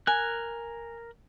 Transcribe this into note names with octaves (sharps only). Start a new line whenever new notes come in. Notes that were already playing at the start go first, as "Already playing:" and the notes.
A#4 G#5 F#6